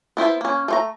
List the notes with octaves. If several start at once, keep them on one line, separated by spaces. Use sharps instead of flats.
B3 E4 C5 B5
A#3 C#4
A3 C5 A#5